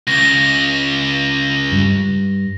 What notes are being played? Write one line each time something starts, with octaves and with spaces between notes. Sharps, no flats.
C#2 A#6
G2